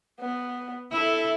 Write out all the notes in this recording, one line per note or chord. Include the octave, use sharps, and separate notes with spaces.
B3
E4 A4 E5